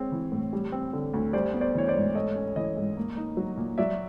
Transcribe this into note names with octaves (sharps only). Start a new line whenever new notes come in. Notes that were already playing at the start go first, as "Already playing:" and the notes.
Already playing: G#3 C4 C#5
E3
A2
G3
C4
D3
D2
G3 C5 D5
B3
C5 D5
E3 C#5
C5 D5
G#2
A3 C#5 D#5
C#4
E3 C#5 D#5
G#2
A#3
D#4
F#3
A#2
F#3 D5 E5